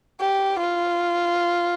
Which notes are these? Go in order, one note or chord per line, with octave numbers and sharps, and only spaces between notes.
G4
F4